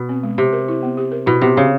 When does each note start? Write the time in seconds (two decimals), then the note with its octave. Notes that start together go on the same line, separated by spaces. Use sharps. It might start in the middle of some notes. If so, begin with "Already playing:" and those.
Already playing: B2
0.09 C4
0.23 G#3
0.38 C3 G4
0.53 A#4
0.68 E4
0.83 B3
0.97 G4
1.12 A#4
1.26 B2 E4
1.41 C3 B3
1.56 C#3 C4